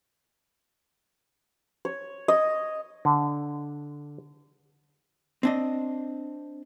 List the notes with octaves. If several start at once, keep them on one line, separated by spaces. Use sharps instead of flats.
C#5
D#5
D3
C4 D4 D#5